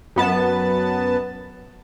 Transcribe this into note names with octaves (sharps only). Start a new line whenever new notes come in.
F#2 B3 A5